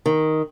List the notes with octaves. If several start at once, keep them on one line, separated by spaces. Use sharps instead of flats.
D#3